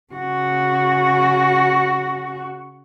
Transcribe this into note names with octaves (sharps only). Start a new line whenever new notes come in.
C#3 F#4